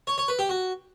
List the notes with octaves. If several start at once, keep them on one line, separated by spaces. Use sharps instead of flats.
C#5
C#5
B4
G4
F#4